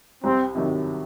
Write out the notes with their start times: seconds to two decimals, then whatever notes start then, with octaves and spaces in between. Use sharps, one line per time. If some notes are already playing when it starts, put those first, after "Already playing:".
0.23 C2 C4
0.55 C3 D#3 F#3